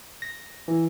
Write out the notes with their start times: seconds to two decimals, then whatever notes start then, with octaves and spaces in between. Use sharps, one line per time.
0.22 A#6
0.68 E3